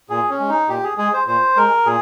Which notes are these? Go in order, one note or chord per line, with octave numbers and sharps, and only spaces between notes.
A#2 G#4
C#4
G#3
D#4
A#2 G4
G#4
G#3 G#4
C5
A#2 C5
G#3 A#4
A#2 G#4